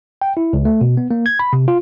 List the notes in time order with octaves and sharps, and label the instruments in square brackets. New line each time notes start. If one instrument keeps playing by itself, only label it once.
[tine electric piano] G5
E4
C#2
A3
B2
B3
A#3
G#6
B5
C3
F4